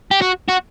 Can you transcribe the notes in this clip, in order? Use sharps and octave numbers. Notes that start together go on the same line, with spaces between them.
G4
F#4
F#4